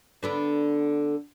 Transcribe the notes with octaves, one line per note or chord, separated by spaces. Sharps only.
D3 B3 D4